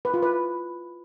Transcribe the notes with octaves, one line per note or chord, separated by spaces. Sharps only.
B4
F4
B4